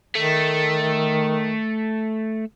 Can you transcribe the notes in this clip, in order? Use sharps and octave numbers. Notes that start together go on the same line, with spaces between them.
D#3 A3